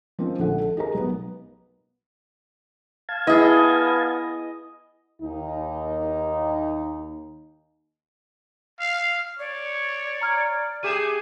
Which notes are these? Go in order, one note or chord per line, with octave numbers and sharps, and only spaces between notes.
F3 A#3 C4 C#4 D#4
A#1 D3 A3 A4 F#5
A4
D#4 G4 G#4 A#4 A#5
B1 B3
F5 A5 G#6
B3 E4 G#4 D#5
D#2 D#4
F5
C#5 D5
A#5 F6 G#6
A3 G4 G#4 D#7 E7